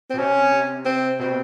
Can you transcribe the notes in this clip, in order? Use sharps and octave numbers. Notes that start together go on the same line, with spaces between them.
C4
B2
C3 C#4
C3
C4
B2 C4